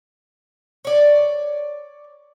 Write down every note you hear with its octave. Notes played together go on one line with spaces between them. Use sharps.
C#5 D5